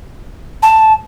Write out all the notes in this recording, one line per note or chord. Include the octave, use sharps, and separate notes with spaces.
A5